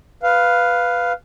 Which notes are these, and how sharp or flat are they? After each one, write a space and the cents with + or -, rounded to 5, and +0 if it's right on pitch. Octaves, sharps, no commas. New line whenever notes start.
B4 +0 F5 +0